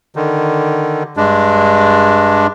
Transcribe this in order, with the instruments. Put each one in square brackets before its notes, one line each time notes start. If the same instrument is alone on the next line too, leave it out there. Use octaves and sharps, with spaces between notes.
[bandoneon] D3 D#3
G2 G#3 D4